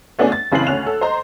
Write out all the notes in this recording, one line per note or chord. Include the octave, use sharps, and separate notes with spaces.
A3 B3 C#4 D4 F#4 G#4
A6
F#1 C#3 E3 C4 C7 F#7
D2 C#4 F#6 F7
A4
C5 D#5 A#5 C6